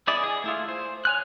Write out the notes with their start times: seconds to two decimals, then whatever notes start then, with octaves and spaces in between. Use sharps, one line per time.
0.07 B3 E4 G#4 D5 D#5
0.24 G#4
0.44 A3 E4 F4
0.68 C5
1.05 C#5 G#5 F#6